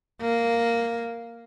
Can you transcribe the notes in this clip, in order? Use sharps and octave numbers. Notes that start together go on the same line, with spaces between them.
A#3